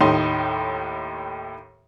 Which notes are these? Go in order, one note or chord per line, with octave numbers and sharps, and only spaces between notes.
D#2 A2 D#4 C6